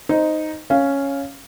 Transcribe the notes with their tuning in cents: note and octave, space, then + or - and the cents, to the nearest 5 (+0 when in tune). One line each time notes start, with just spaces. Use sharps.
D#4 +0 C5 +0
C#4 +0 F5 +0